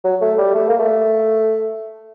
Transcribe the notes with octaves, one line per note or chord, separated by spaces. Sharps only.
F#3
A3
G3
A3
A#3
A3